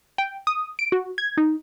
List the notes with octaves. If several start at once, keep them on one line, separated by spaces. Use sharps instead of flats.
G5
D#6
D7
F#4
G#6
D#4